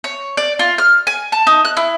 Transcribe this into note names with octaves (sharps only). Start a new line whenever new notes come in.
C#5
D5
F4
F6
G#5
A5
D#4
F#6
E4